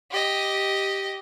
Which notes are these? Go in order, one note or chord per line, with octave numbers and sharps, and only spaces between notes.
G4 D#5